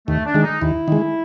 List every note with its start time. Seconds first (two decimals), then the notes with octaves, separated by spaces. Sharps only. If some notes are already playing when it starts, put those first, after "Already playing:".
0.08 D#2 A3
0.26 D4
0.34 D#3 G#3
0.43 D#4
0.61 D#2 E4
0.88 D#3 G#3